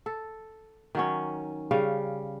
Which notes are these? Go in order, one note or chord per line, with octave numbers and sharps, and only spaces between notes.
A4
D#3 F#3 C#4
C#3 G3 F5